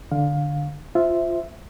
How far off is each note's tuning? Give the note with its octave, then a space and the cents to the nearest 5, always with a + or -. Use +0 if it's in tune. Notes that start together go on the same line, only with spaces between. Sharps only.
D3 +0 F5 +20
F4 +0 C5 -5 E5 +0